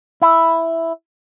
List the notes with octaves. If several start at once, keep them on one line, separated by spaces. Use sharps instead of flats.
E4